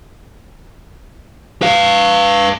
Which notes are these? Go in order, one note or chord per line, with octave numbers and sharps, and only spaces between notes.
B4 F5